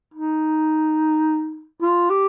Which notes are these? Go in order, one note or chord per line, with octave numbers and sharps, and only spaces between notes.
D#4
F4
G4